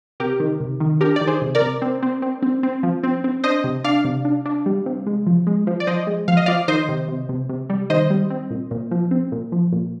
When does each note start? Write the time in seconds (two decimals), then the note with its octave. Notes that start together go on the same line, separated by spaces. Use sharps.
0.20 C3 G4 A#4
0.40 D#3
0.60 C3
0.80 D#3
1.01 D4 G4 A#4
1.16 D5
1.21 D#3
1.27 G#4 C5
1.42 C3
1.55 A#4 D5
1.62 C3
1.82 C4
2.02 C4
2.22 C4
2.42 C4
2.63 C4
2.83 F3
3.03 C4
3.24 C4
3.44 D4 C5 D#5
3.64 C3
3.84 D4 D5 F5
4.05 C3
4.25 D4
4.45 D4
4.66 G3
4.86 C3
5.06 G#3
5.27 F3
5.47 G#3
5.67 F3
5.80 D5
5.87 F3 C5 D#5
6.07 G#3
6.28 F3 F5
6.37 D#5
6.46 F3 D5 F5
6.68 D#3 C5 D#5
6.89 C3
7.08 C3
7.29 C3
7.49 C3
7.70 G3
7.90 D#3 C5 D#5
8.10 G3
8.30 C4
8.51 A#2
8.71 A#2
8.91 F3
9.11 C4
9.32 A#2
9.52 F3
9.72 A#2